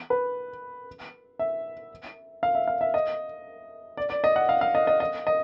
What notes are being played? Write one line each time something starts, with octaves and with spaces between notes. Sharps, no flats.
B4
E5
F5
E5
F5
E5
D#5
D5
D5
D#5
F#5
F5
F5
D#5
D#5
D#5
D#5